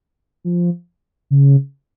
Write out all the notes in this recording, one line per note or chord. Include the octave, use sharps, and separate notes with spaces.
F3
C#3